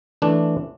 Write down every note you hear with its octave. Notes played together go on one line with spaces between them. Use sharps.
E3 A3 D4